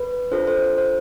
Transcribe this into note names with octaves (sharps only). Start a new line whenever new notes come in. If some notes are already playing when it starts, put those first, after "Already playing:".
Already playing: B4
D4 F4 A4 C5
C5
C5
C5